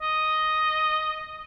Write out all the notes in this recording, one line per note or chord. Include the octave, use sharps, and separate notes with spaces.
D#5